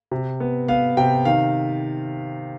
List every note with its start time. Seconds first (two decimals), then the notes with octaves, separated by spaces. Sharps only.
0.11 C3
0.40 B3
0.68 B3 F5
0.97 C3 G5
1.25 D#3 F5